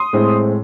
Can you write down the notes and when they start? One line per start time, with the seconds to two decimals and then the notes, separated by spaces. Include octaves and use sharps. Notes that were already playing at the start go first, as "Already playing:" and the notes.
Already playing: C6 D#6
0.13 A2 G#3 C4